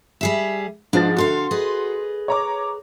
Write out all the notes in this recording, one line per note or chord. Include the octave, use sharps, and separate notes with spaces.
G3 G#4 E5
G#2 F3 D4 A6
D2 D3 F#4 F5 C6
G#4 B4 D#5
C#5 A#5 D6